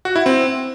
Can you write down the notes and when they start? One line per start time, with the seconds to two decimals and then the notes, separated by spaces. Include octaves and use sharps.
0.05 F#4
0.16 E4
0.26 C4